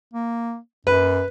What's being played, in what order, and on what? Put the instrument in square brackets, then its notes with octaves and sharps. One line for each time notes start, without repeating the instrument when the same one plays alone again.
[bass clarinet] A#3
[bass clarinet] F#2 [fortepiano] B4